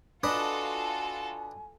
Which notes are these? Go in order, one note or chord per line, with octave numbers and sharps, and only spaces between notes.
D4 F4 F#4 A4 B4 D#5 G#5